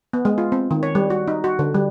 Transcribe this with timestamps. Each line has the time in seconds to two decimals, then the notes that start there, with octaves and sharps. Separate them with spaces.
0.13 B3
0.25 G#3
0.38 F4
0.52 C4
0.71 D#3
0.83 C#5
0.95 G3
1.10 F#4
1.28 D#4
1.44 F#4
1.59 D3
1.74 G3